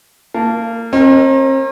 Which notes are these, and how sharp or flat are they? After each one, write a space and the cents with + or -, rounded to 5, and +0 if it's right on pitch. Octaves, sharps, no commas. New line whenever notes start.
A#3 -25 A5 +0
C4 +45 A#4 +0 D#5 +0